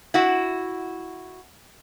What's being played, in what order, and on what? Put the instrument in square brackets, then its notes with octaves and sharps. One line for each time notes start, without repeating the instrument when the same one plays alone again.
[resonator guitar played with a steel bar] E4 F#4